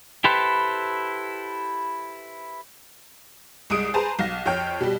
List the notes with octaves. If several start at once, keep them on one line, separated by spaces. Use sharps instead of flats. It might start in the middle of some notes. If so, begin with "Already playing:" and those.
E4 G4 A4 B4 C5
C2 G#3 D#6 D7
G#4 B4 C5 A5 A#5
B1 F5 A#6
F2 C#5 G5 F6
B2 G3